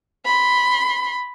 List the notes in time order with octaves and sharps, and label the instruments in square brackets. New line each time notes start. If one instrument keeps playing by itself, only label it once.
[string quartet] B5 C6